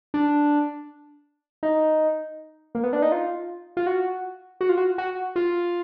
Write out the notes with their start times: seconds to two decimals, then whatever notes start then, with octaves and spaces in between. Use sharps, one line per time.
0.14 D4
1.63 D#4
2.75 A#3
2.84 B3
2.93 D4
3.02 D#4
3.12 F4
3.77 F4
3.87 F#4
4.61 F#4
4.69 F4
4.77 F#4
4.98 F#4
5.36 F4